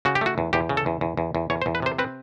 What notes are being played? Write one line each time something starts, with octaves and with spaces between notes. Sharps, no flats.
C#3 F#4
G4
A3 F#4
E2
E2 G4
C#3
A4
E2
E2
E2
E2
E2 C#5
C5
E2
B4
C3 C5
C4 B4